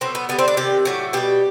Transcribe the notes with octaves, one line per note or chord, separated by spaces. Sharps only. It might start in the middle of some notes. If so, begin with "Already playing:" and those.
B2 F#3 A3 C4
B3
D3 G3 B3
C4
D4
C3 D#3 G3 G4
A2 F#3 A3 G4
B2 G3 G4